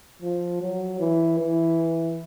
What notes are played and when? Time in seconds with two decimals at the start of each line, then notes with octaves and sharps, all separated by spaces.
0.22 F3
0.61 F#3
1.00 E3
1.39 E3